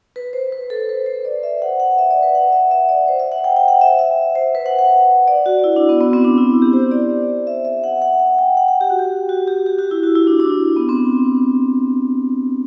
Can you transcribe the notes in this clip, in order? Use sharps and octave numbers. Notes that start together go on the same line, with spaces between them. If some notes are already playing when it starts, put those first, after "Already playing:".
B4
C5
B4
A4
B4
C5
D5
E5
F#5
F#5
E5
D5
B4
F#5
E5
E5
D5
C5
E5
F#5
G5
G5
F#5
E5
E5
C5
B4
F#5
F#5
D5
F#4
E4
D4
B3
B3
C4
D4
E4
G4
C5
D5
E5
E5
F#5
F#5
F#5
G5
F#5
F#5
G4
F#4
G4
F#4
G4
G4
F#4
E4
F#4
E4
D4
D4
B3
C4